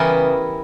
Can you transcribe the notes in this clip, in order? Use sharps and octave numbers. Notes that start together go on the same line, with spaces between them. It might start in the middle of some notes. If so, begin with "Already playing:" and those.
Already playing: C#3 E3 G3 B3 E4 A#4